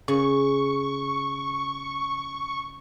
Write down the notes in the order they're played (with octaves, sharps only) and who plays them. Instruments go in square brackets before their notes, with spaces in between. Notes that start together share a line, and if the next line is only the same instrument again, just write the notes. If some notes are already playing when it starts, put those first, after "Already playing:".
[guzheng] C#3 [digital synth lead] C#6